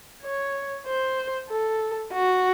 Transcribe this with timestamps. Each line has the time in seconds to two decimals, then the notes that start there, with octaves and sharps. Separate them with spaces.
0.22 C#5
0.87 C5
1.50 A4
2.13 F#4